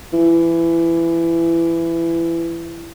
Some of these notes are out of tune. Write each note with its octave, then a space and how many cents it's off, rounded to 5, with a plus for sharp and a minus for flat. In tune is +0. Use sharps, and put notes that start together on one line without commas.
E3 +20